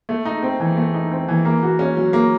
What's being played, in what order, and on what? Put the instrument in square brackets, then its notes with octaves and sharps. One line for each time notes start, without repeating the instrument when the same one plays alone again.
[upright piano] A3
D#4
C4
E3
A3
D#4
C4
E3
A#3
F#4
C#4
F#3
A#3